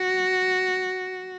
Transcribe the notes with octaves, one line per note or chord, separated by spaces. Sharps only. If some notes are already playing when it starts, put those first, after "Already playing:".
Already playing: F#4